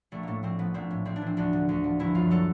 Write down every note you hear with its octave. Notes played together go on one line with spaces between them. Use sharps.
A#1 A3
A2 A3 A#3
A#1 C4
F3 B3
A#1 C4
A2
A#1 C4
D4
E3
C4
D2 D4
D3
D2
F3
G1 E4
F#2 F4
F#3 A4